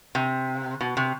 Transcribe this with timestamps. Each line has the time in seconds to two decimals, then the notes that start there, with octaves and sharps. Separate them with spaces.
0.15 C3
0.81 B2
0.97 C3